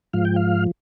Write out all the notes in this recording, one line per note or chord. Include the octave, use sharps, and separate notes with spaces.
G#2 F3 F5
G5
F5